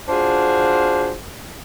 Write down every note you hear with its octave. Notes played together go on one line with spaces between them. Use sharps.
D4 F4 F#4 G#4 C5